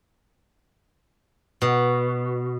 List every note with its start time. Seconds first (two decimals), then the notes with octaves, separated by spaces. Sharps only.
1.62 B2